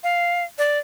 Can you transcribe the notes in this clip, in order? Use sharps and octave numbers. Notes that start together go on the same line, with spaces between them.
F5
D5